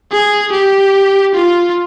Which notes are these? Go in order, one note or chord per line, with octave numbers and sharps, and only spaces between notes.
G#4
G4
F4